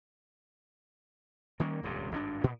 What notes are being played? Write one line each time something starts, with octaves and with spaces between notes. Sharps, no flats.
D#3 G3 A#3 C#4
D#1 C#2 G2 C3
G#1 G2 C4 D4
A#2